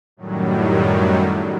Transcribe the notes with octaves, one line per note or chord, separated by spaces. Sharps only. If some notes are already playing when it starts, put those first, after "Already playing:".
F#2 A2 D#3 F#3 G3